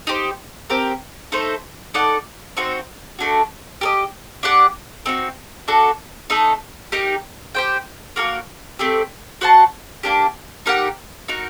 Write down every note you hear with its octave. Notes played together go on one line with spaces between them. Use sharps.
D#4 G4 C5
C4 G4 A#4
A3 D#4 A4 C5
D#4 A4 D5 F#5
C4 D#4 F#4 C5
A3 D4 F#4
G4 A#4 D#5
D4 G4 D5 F#5
C4 D#4 F#4
D4 F#4 A4
A3 D#4 A4 D#5
D#4 G4 A#4
G4 C5 G5
A#3 F#4 A#4
A3 C4 G4
F#4 C5 F#5 A5
A#3 D4 G4
D#4 G4 A#4 F#5
D#4 F#4 A#4